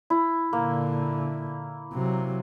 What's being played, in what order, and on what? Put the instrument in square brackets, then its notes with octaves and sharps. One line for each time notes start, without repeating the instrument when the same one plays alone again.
[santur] E4
[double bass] A#2 D3 [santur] A#3
[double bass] C3 F#3